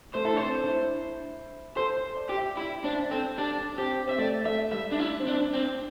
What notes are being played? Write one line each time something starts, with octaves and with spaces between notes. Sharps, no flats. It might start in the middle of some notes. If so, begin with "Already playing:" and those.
A3 C5
E4 A4
D4
C4 C5
D4
E4
A4 C5
C5
D5
G4
E5
E4 D5
D4 C5
C4 A4
D4 G4
D4
C4 G4
C4 E5
A3 D5
A3 E5
G3 E5
D4
E4
C4
D4
D4
C4